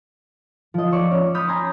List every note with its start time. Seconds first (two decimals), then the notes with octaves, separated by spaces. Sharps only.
0.74 F3 D#5
0.91 D5 C#6 E6
1.11 C#4
1.34 B5 D#6 F6 G6 B6
1.48 G#5 A#5 C6